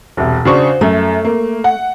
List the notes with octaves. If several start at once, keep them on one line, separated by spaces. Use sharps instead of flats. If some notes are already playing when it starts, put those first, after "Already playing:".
E1 C2
C#3 D4 F#4 C5 C#6
F#2 A3
A#3
F#5